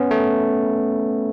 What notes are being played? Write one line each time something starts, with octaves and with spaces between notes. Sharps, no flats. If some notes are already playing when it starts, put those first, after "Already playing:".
Already playing: B3 C#4
A3